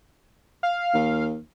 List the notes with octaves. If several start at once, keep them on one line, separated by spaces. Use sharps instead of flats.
F5
D#2